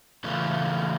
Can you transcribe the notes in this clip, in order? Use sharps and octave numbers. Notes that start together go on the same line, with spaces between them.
C#3 E3 A3 C#4 F4